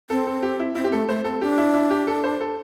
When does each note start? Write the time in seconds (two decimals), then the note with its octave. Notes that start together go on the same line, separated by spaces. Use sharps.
0.10 C4 A4
0.27 A4
0.43 G4
0.60 E4
0.75 C4 E4
0.84 G4
0.92 A3 A4
1.09 A3 C5
1.24 C4 A4
1.41 D4 G4
1.58 E4
1.74 E4
1.90 G4
2.07 A4
2.24 C5
2.41 A4